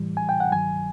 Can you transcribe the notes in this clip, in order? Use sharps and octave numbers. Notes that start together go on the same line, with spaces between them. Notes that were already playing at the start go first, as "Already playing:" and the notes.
Already playing: A2 E3 G3
G#5
G5
F#5
G2 D#3 F#3 G#5